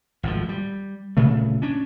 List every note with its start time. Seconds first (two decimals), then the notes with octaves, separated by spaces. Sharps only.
0.23 G#1 A2 D3 F3
0.49 G3
1.17 G1 A#2 C#3 A3
1.62 C#4 D4